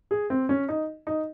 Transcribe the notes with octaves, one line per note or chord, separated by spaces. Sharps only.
G#4
C4
C#4
D#4
D#4